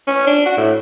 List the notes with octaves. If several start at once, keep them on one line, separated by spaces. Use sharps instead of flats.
C#4
D4
F#4
A2